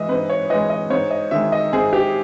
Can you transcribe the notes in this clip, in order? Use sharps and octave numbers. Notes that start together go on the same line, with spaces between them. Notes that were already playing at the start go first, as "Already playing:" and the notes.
Already playing: E3 G#3 D#5 E5
G#2 B4
C#5
E3 G#3 D#5
D#5
G#2 C#5
D#5
D#3 G#3 E5
D#5
G#2 G#4
G4